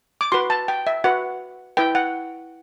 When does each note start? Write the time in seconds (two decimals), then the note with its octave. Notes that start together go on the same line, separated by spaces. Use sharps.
0.21 D6
0.32 F#4 B4 C6
0.50 A5
0.68 G5
0.87 E5
1.04 F#4 B4 F#5
1.77 E4 B4 G5
1.95 F#5